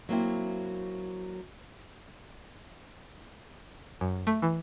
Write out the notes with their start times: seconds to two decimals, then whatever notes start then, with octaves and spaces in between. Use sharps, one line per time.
0.09 F#3 A#3 C4 E4
4.01 F#2
4.27 A3
4.42 E3